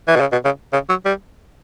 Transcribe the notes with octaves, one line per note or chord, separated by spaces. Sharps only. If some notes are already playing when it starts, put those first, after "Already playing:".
E3
B2
C#3
B2
C#3
C#3
F#3
G3